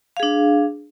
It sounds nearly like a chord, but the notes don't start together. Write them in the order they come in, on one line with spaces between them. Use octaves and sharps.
F5 G#4 D4